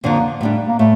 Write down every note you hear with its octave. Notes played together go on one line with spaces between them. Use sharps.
F2 D3 F3 A#3
A2 G3 D4
A#3
A2 A3